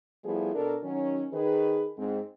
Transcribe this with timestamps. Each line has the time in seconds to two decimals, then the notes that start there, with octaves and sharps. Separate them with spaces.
0.25 F3 G3 A3 B3 E4 G#4
0.55 B2 D4 A4 A#4
0.83 D#3 F#3 C#4
1.33 D#3 G#4 B4
1.98 G#2 C4